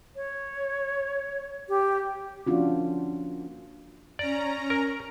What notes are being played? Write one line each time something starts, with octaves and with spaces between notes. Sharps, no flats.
C#5
G4
F3 A#3 C#4 D4 F4 F#4
C#4 D5 A#5
A#4